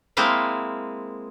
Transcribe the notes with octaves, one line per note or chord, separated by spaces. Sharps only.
G#3 A#3 C4 E4 F5